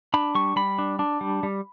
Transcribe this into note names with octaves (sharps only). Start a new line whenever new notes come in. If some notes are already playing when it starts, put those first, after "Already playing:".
D4 B5
G3 C#6
G3 B5
D4
D4
G3
G3